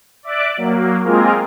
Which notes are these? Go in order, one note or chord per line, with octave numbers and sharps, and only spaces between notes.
D5 E5 D6 F#6
F#3 A#3
G#3 A#3 C4 F4 G#4 A#4